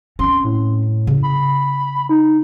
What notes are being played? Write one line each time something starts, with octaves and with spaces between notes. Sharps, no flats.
C4 C#4 C6
A2
C#3
B5
D#4